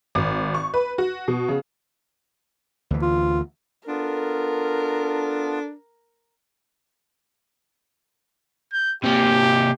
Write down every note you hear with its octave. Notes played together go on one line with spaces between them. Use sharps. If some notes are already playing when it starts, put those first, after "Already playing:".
G#1
C#6
B4
F#4
B2
C#3
D2 E3
F4
B3 D4 F4 A4 A#4
G6
C3 A#3 G4